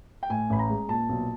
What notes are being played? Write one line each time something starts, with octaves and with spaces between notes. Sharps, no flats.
G5
A2 G#5
A1 B5
A#5
G#3
A#2 A5
B1